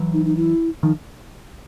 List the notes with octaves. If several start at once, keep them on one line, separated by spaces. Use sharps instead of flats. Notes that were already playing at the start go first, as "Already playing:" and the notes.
Already playing: E3 F#3
D#4
D#4
E4
D#3 F3 D#4